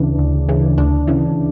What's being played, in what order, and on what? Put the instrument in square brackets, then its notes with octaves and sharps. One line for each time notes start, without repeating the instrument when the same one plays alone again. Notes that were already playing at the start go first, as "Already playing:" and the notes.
Already playing: [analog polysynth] D2 C#3 E3 D4
D2
C#3 E3
D2 D4
C#3 E3